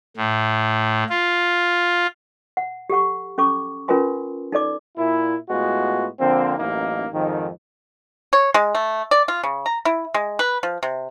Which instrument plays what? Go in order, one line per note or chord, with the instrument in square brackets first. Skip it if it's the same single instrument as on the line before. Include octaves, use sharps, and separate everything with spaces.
[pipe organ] A2
F4
[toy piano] F#5
G4 A4 F#5 C#6
C#4 A4 C#6 D6
C#4 F4 A#4 B4 G#5 C6
D#4 A4 D5 D6
[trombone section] A#2 E4
A2 G#3 B3 F4 F#4
D3 F3 A#3 C4
A1 F#2 A#3 D#4
F2 G#2 D#3
[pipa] C#5
G#3
A3
D5
F4
C#3
A#5
E4
G#3
B4
F3
C3